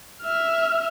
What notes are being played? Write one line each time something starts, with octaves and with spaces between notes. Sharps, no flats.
E5 F6